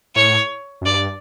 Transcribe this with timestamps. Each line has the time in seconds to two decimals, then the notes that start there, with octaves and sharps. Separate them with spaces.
0.16 A2 C#5
0.81 F#2
0.86 G2 D5